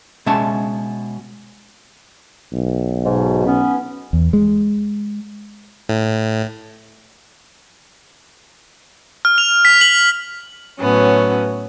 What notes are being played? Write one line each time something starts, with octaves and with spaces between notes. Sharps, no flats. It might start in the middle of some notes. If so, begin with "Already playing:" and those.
B2 G#3 C#4 E5 A5
B1
G#2 B2
B3 C#4
E2
G#3
A2
F6
F7
B6
F#7
A2 F#3 B3 C#4